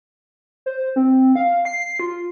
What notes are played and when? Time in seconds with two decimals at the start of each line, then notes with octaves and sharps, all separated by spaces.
0.66 C5
0.96 C4
1.36 F5
1.65 C7
1.99 F4